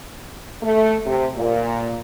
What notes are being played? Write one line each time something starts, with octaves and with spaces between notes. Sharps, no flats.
A3
C3
A#2